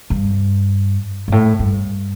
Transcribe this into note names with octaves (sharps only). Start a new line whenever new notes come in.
G2
G2
A2
G2